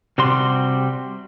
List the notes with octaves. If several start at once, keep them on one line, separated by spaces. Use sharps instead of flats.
C3 G3 F#4 D5 C6